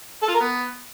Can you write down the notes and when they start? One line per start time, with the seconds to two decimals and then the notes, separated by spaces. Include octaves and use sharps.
0.23 A4
0.28 F4
0.34 A#4
0.40 B3